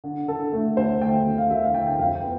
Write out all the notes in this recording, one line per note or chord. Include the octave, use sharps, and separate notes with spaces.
D3
D3 A4
A3 A4
D2 C5
A3 G5
D2
F5
D2 E5
F5
D3 G5
G5
F2 F5
G5
B3